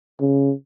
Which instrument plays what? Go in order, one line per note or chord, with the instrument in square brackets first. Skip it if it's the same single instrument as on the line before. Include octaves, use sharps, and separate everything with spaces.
[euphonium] C#3